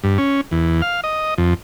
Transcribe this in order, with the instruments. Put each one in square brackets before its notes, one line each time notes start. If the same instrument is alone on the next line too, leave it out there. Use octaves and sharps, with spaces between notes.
[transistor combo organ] G2
C#4
E2
F5
D#5
F2